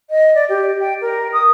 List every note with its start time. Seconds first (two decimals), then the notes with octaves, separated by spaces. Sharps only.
0.10 D#5
0.35 D5
0.49 G4
0.80 G5
1.01 A#4
1.33 D#6